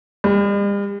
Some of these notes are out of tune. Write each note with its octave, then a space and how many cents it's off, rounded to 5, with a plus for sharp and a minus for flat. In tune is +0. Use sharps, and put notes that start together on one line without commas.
G3 +45